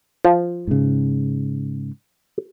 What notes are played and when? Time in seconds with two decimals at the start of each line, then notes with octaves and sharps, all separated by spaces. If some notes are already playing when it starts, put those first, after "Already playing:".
0.25 F3
0.67 G#2 C#3